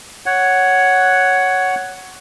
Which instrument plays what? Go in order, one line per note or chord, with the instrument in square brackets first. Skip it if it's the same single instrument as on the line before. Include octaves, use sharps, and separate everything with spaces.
[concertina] C#5 F#5